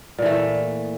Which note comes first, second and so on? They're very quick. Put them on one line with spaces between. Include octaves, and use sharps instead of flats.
A#2 E3 A3